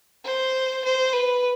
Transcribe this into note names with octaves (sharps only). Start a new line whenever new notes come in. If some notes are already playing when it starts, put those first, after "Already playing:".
C5
C5
B4